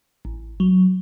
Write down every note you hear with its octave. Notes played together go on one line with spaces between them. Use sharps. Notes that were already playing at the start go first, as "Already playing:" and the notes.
A1
F#3